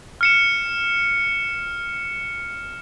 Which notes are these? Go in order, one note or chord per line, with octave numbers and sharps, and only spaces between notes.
F6 C#7 E7